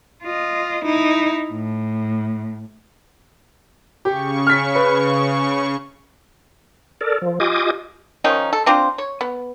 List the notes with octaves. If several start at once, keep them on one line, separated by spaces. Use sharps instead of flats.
F4 D#5
D#4 E4
A2
C#3 G4 C#6
F6 B6
B4
A4 A#4 D5
F3
F4 G4 D#5 G#5 D6 D#6
D#3 F3 C#4 D#4
A4
C4 D4 F4 C5
C#5
B3